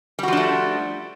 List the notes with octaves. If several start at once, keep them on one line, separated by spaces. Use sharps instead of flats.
F3 G3 A3 D4 F#4